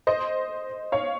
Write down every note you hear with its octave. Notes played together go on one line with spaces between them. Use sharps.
C5 D#5
C#5 F5